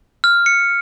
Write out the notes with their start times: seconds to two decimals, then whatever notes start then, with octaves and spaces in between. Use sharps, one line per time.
0.24 F6
0.46 C#7